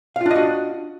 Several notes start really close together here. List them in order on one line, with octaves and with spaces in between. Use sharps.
F5 F4 D4 D#5 F#4